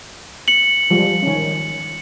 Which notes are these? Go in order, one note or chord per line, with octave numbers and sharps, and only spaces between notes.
C#7 F#7
F3 G3 G#3
D#3 C#4